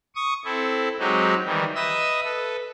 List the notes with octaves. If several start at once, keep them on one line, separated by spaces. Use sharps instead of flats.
C#6 D#6
C4 E4 A4
F#3 G#3 C4 D#4 F#4 G4
D#3 E3 G3
B4 D#5 E5 D#6 E6
A4 B4